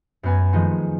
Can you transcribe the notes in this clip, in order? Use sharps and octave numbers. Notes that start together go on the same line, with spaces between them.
F#2 B3 G#5
D#3 F3 G#3 A3